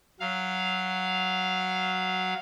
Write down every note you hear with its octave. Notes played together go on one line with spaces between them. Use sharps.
F#3 F5